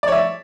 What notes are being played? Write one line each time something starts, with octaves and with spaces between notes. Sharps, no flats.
C#5 D5 E5